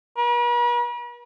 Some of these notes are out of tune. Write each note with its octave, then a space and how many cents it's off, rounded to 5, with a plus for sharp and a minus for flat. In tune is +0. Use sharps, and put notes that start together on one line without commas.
B4 -45